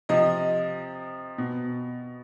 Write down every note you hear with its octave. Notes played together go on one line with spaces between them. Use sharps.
C3 F3 D#5
B2